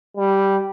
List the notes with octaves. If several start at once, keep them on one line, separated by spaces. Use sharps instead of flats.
G3